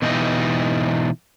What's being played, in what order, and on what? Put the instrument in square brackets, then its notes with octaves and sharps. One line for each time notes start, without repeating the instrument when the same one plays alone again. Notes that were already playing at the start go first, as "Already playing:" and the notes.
[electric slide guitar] B2 E3 D#4 F4 G4 D#5